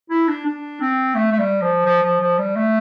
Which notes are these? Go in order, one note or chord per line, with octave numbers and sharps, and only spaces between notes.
E4
D4
D4
C4
A3
A3
G3
F3
F3
F3
F3
G3
A3